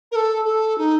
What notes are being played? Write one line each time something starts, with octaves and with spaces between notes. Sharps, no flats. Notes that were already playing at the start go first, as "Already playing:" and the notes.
A#4
A4
A4
D#4